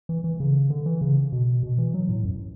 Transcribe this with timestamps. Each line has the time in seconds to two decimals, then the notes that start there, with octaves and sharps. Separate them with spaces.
0.09 E3
0.24 E3
0.40 C#3
0.70 D3
0.86 E3
1.01 C#3
1.32 B2
1.63 B2
1.78 E3
1.94 F#3
2.09 A2
2.25 F#2